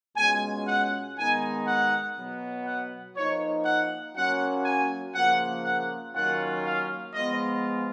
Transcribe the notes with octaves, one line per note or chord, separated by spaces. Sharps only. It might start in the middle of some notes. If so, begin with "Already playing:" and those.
B2 G#3 C#4 F4 G#5
F#5
D#3 G#3 B3 D#4 G#5
F#5
B2 F#3 B3
F#5
F3 A#3 D#4 C#5
F#5
F#3 A#3 C#4 F4 F#5
G#5
C#3 F3 A#3 F4 F#5
F#5
D#3 F#3 A#3 C#4 F4 F#5
F5
F3 G#3 B3 F4 D#5